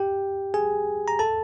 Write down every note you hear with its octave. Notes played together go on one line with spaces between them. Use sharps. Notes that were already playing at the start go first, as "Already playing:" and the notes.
Already playing: G4 G5
G#4 G#5
A#5
A4 A5